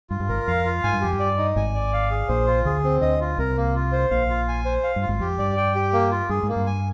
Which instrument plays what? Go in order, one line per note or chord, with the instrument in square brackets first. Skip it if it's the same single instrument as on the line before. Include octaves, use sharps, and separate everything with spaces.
[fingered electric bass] G2 [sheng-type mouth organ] F4
[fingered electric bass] G2
[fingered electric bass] G#1 G#2 [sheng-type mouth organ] A#4
[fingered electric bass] F2 [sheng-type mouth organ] F5
[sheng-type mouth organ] F4
[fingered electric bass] G#2 [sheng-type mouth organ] G#5
[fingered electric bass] G2
[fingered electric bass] F2 [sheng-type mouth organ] G4
[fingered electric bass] G2
[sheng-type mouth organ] D5
D#4
[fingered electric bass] G#1 G#2 [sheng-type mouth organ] G#5
[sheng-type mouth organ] D5
F5
G#4
[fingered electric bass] A#1 A#2 [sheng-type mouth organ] C5
[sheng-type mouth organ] F4
[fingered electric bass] D2 D3 [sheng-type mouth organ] G#4
[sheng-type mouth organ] C4
[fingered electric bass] D2 D3 [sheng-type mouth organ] D#5
[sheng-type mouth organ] F4
[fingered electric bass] C2 C3 [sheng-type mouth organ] A#4
[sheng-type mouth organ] A#3
F4
C5
[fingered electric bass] A#1 A#2 [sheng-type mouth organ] F5
[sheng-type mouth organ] F4
G#5
C5
F5
[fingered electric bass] G2
[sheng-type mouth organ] F4
[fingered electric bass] G#1 G#2
[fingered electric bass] F2 [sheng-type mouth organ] G4
[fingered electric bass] G2 [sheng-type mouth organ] D5
[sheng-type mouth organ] G5
G4
A#3
F4
[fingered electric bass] G2 [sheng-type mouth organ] G#4
[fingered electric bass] G#2
[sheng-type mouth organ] A#3
[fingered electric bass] G2
[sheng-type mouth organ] G#5